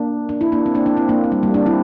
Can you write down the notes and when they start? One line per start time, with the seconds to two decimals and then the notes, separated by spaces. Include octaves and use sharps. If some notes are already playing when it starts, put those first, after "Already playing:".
Already playing: A#3 D4
0.29 D4
0.41 E4
0.52 A#3 D4
0.66 C4
0.75 A#3 D4
0.86 A#3 D4
0.97 C4 E4
1.09 A#3 D4
1.24 C4
1.32 G3 A#3
1.43 G3 A#3
1.54 A#3 D4
1.66 C4 E4